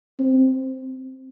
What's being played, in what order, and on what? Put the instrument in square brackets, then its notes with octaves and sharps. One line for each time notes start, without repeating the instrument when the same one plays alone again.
[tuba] C4